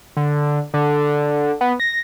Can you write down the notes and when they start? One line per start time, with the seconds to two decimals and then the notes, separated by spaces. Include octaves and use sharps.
0.17 D3
0.74 D3
1.61 B3
1.80 A#6